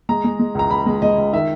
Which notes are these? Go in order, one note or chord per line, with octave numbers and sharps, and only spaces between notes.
G#3 A#5
G#3
G#3
C#2 A#5
C#2 B5
G#3
G#3 D#5
C#2
D#3 E5